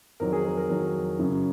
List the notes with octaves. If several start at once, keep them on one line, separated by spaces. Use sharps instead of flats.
F2 D#3 F#3 A#4
G#4
A#4
A#4
F2 D#3 F#3 A#4
F#2 C#3 F#3